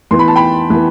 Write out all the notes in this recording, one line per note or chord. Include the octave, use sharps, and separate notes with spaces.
E3 B3 C6
B5
A5
G5 B5
E3 B3